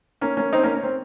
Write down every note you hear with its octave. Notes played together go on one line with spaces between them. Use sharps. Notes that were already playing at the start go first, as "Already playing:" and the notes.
A#3 C#4
A#3 C#4
C4 D#4
A#3 C#4
C#4
C4